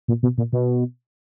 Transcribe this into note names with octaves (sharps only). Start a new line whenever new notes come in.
A#2
B2
A#2
B2